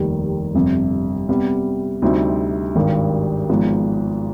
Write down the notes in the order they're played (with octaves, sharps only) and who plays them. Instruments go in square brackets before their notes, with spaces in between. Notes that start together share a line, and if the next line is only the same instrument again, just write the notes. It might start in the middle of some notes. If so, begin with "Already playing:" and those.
Already playing: [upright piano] F1 D#2 D#3 G3
G1 F2 C3
C3 G3 B3
D2 C3 G3 C4 D#4
G#1 G2 D#3 G3
G#1 G#2 F3 B3